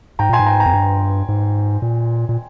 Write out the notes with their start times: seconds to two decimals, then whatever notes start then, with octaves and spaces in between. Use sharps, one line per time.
0.19 G#2 G5 A#5
0.29 A#2 G#5 C6
0.39 G#2
0.46 G5 A#5
0.60 G5 A#5
0.66 F2
0.74 G2
1.29 G#2
1.82 A#2
2.29 A#2